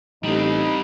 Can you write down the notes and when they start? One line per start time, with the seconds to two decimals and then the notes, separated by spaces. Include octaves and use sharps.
0.24 A1 G3 C4 D#4